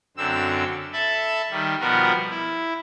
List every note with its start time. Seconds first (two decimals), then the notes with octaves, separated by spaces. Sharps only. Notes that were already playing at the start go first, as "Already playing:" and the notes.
0.17 F#2 D3 C4 E6
0.93 A4 E5 A5 B5
1.51 D#3 G3
1.80 B2 F3 G3 B3 F#4 A#4
2.30 E4